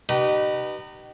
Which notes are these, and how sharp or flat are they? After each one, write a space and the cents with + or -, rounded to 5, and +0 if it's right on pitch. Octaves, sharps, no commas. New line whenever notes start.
D#4 -30 G4 -35 B4 +0